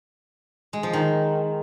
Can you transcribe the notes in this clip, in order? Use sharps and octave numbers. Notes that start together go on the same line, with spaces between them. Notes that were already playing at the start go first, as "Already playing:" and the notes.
G#3
F3
D#3